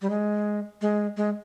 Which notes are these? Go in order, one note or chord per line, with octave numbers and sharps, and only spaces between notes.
G3
G#3
G#3
G#3